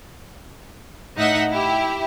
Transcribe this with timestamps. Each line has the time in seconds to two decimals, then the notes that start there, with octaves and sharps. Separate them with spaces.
1.17 A2 D#4 D#5 E5 F#5 B6
1.50 E4 G4